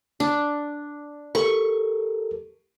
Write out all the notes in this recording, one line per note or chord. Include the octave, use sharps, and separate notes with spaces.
D4
G4 A4 A#4 C#6